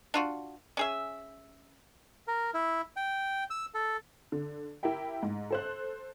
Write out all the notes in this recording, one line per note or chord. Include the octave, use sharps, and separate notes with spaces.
D4 F4 F#4
C#4 G#4 E5
A#4
E4
G5
E6
A4
D3
E4 G4 A#4 E5 G5
G#2
A4 C5 F#6